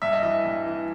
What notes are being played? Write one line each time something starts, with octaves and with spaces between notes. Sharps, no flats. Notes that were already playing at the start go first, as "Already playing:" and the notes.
G2 E5
D#5
E3 E5
G2
E3